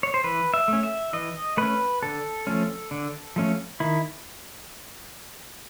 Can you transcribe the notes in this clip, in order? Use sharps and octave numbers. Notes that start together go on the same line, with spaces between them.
C#5
C5
E3 B4
E5
A3 C#4
E5
E3 D#5
A3 C#4 B4
D3 A4
F3 A3 C#4
D3
F3 A3 C#4
D#3 E4